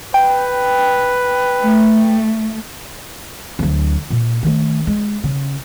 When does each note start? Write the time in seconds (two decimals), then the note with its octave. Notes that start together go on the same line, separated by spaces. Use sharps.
0.14 B4 G5
1.63 A3
3.59 D2 F#3
4.10 A#2
4.43 D#3 A3
4.87 G#3
5.24 C#3